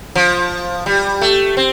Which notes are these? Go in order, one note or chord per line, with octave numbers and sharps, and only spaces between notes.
F3
G3
A3
C4